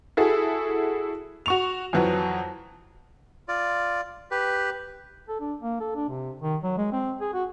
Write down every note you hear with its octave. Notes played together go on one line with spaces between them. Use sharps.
E4 F#4 G#4 A4
F#4 C#6 F7
F2 E3 F#3
F4 D5
G4 B4
A4
D4
A#3
A4
D4
C3
D#3
F#3
G#3
C4
G#4
F#4